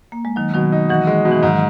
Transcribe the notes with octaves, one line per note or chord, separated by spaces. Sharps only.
A#3
G#3
D#3 F#3 D#4
B2 D#3 F#3
D#4
E3 F#4
G#3
B2
E3
G#2 D#3 F#3